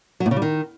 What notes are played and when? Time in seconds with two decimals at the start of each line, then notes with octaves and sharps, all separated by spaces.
0.20 F#3
0.26 A2
0.31 C#3
0.36 G3
0.42 D#3